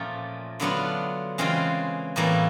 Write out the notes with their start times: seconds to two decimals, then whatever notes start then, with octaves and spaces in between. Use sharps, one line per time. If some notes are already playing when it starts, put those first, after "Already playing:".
Already playing: A#2 F3 A3 C#4
0.60 D3 F#3 B3 D4 F4
1.38 C#3 E3 G#3 C4 F4
2.16 A2 E3 G3 A#3